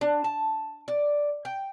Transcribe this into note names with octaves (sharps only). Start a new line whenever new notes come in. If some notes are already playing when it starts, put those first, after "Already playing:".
D4
A5
D5
G5